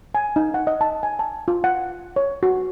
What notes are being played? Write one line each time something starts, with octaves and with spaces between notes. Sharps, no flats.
G#5
D#4
F#5
D#5
A5
G#5
A5
F4
F#5
C#5
F#4